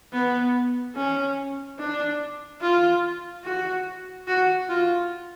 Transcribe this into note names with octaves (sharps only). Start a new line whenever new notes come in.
B3
C#4
D4
F4
F#4
F#4
F4